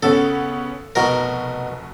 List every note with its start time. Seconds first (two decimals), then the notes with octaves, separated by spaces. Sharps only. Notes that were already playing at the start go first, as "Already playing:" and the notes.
0.03 C#3 B3 C#4 A4
0.95 F1 B2 F#4 A#4